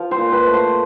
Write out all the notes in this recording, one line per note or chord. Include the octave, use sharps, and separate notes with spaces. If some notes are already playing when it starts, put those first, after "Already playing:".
Already playing: F3
C5
A#2
B4
A3
C5